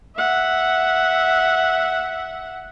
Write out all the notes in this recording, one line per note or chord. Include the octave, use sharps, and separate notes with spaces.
E5 F#5